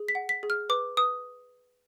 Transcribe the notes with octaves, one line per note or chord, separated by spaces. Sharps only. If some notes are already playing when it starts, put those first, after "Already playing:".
Already playing: G#4
B6
F#5
B6
G#4
F6
B4 D6
B4 D#6